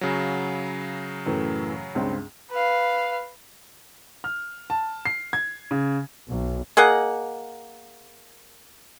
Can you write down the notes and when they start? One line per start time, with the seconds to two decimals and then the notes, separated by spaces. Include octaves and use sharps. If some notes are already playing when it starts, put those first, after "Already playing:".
0.01 C#3 F#3
1.26 F#2 A2 E3
1.95 C#2 G2 C4
2.50 B4 F5
4.24 F6
4.70 A5
5.05 C7
5.33 G#6
5.71 C#3
6.27 B1
6.77 A#3 G#4 D#5 F#5